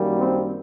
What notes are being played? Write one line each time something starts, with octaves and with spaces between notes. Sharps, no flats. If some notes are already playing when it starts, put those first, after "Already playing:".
Already playing: F#2 D#3 G3 A#3
C4